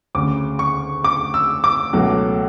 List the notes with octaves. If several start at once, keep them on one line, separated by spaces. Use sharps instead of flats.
D2 C#3 G#3 D6
C#6
D6
E6
D6
C#2 B2 F#3 A3